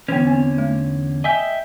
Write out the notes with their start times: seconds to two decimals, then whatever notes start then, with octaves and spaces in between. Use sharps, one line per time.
0.08 E2 D3 E3 B3 C#4
0.27 C4
0.58 A3
1.24 D#5 E5 G5 G#5